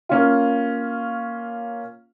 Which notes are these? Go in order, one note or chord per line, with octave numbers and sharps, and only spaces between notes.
A#3 C#4 F4